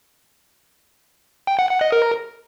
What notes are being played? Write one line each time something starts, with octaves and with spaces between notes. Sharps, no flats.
G5
F#5
F#5
D#5
A#4